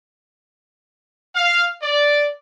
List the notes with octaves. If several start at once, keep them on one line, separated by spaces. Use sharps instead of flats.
F5
D5